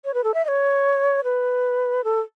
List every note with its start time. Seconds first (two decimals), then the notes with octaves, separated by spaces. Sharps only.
0.05 C#5
0.14 B4
0.24 A4
0.34 E5
0.45 D#5
0.48 C#5
1.24 B4
2.04 A4